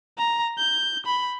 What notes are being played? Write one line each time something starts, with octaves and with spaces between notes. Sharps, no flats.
A#5
G6
B5